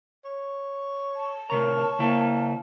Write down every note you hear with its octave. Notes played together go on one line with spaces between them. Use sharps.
C#5
A5
A2 C3 A#4 C#5 A#5
C#3 A#3 E4